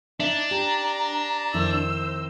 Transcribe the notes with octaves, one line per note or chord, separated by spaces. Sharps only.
D4 D#4 E5
G4 A#5
F2 D#3 E4 C5 E6